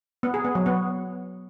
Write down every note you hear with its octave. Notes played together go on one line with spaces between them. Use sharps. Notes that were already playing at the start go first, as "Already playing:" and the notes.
B3
G#4
B3
F#3
B3